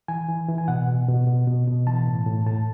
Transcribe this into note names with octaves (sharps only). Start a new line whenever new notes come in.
E3 G#5
E3
E3
G#5
B2 F#5
B2
B2
B2
B2
B2
E3 A5
A2
A2
A2 A5